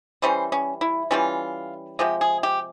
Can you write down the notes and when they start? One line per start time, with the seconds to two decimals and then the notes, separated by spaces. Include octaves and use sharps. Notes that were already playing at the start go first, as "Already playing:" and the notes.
0.22 E3 G3 C#4 C5
0.52 C#4
0.81 E4
1.11 E3 G3 C#4 F4
1.99 C3 F3 G#3 G4
2.21 G#4
2.43 G4